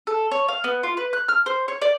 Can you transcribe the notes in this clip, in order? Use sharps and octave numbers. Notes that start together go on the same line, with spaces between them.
A4
C#5
F5
B3
F4
B4
F#6
F6
C5
C#5
D5